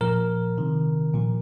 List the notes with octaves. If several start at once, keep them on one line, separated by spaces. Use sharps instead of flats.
A#2 F3 A#4
C3 D#3
A#2 F3